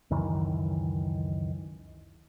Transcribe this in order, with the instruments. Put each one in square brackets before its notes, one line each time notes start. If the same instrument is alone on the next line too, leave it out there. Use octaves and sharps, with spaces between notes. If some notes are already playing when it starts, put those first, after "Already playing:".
[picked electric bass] C#2 F#2 D#3 E3